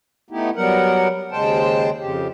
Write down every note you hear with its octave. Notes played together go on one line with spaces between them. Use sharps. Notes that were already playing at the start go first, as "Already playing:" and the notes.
A3 B3 D#4 E4 G4
F#3 G3 B3 A#4 F#5
D#2 C#3 G#3 C5 G5 A5
F2 C#3 G4